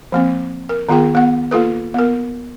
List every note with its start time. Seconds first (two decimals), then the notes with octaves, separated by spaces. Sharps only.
0.12 F3 A#3 C4
0.69 A#4
0.89 D#3 B3 F4 G#4 G5
1.15 B3 F#5
1.51 A#3 F4 A4 B4
1.94 B3 A#4